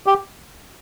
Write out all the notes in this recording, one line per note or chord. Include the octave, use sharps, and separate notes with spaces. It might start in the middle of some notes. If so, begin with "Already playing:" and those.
G4